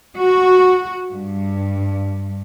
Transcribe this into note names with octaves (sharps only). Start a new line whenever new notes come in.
F#4
G2